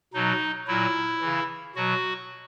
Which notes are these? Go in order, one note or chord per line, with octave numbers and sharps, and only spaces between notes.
B2 F#3 D#4
A#2 F#3 E4
C#3 E3
B2 F#3 F#4